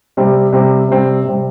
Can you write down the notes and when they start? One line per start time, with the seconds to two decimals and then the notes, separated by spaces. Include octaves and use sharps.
0.17 C3 G3 C4
0.53 C3 G3 C4
0.88 C3 G3 C4
1.25 C3 G3 C4